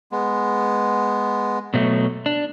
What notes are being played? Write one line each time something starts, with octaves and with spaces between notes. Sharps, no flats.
G#3 B3
B2 F#3 A3
D4